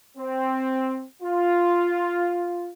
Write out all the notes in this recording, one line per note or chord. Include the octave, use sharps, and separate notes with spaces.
C4
F4